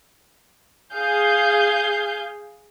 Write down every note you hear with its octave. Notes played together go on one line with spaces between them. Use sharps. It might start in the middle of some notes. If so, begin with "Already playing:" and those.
G#4 F5 G6